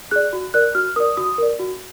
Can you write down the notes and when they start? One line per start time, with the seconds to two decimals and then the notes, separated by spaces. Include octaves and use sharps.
0.11 G#4 D5 F#6
0.33 F#4
0.54 A#4 D5 F#6
0.75 F#4 F6
0.96 A#4 D5 D#6
1.17 F#4 D#6
1.38 A#4 D5
1.59 F#4